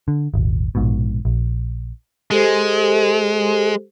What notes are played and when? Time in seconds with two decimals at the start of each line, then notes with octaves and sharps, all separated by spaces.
0.08 D3
0.34 D#1 G#1
0.75 A#1 G#2 B2
1.25 A#1
2.31 G#3 G4 A4 C5